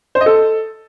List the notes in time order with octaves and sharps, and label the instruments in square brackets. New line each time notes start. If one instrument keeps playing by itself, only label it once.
[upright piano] C5
D#5
A4